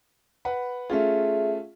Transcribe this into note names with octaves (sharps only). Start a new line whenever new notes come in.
B4 F#5 B5
A3 C#4 F4 G#4 E5